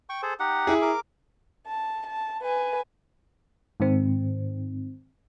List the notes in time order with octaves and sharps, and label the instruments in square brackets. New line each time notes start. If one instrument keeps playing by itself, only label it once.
[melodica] G5 C#6
G#4 A4 C5
D#4 G4 F#5
[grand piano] E4 G#4
[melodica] A#4 D6
[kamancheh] A5
A5
B4 G#5
[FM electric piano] G#2 D#3 C4